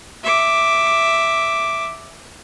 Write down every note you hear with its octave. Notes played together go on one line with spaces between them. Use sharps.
E5 D6